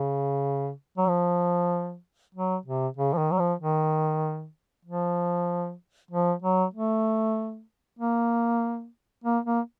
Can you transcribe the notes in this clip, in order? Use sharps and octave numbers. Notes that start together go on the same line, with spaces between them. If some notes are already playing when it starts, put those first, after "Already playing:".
Already playing: C#3
F#3
F3
F#3
C3
C#3
F3
D#3
F#3
F3
D#3
F3
F3
F#3
A3
A#3
A#3
A#3